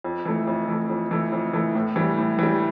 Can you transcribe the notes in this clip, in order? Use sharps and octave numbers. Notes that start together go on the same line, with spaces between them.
F2
E3 A3
F2
E3 A3
F2
E3 A3
F2
E3 A3
A2
E3 G3
A2
E3 G3